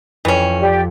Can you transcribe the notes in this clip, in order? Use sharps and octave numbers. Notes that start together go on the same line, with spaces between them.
F2 E3 C#4
G4 D5